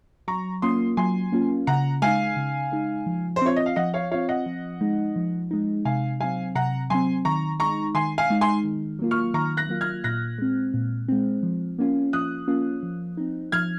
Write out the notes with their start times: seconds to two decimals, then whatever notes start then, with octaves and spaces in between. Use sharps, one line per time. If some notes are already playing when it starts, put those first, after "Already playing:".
0.28 F#3 A#5 C#6
0.62 A#3 C#4 F4 C6 D#6
0.97 F#3 G#5 C6
1.32 A#3 C#4 F4
1.67 C#3 F#5 A#5
2.02 G#3 D#4 F5 G#5
2.36 C#3
2.72 G#3 D#4
3.07 F3
3.36 C5
3.42 C4 F4 C#5
3.56 D#5
3.66 F5
3.76 F3 D#5 F#5
3.94 C#5 F5
4.11 C4 F4 C#5 F5
4.29 D#5 F#5
4.46 F3
4.81 G#3 D#4
5.16 F3
5.51 G#3 D#4
5.85 C3 F5 G#5
6.20 F#3 C4 F5 G#5
6.55 C3 F#5 A#5
6.90 F#3 C4 G#5 C6
7.25 D#3 A#5 C#6
7.60 G#3 D#4 A#5 C#6
7.95 D#3 G#5 C6
8.18 F5 G#5
8.30 G#3 D#4
8.41 G#5 C6
8.64 D#3
8.99 F#3 A#3 F4
9.11 C#6 F6
9.34 D#3 A#5 C#6
9.57 F#6 A#6
9.69 F#3 A#3 F4
9.81 F6 G#6
10.04 A#2 F#6 A#6
10.38 G#3 C4
10.74 A#2
11.08 G#3 C4
11.43 F3
11.79 A#3 C#4 F4
12.13 F3 D#6 F#6
12.48 A#3 C#4 F4
12.83 F3
13.17 C4 D#4
13.52 F3 F6 G#6